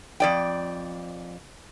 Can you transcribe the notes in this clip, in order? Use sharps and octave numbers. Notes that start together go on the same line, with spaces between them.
F2 D5 G5